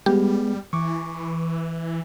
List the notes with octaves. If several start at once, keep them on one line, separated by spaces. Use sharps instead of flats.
G3 G#3 B3 G4 G#4
E3 C#6 D6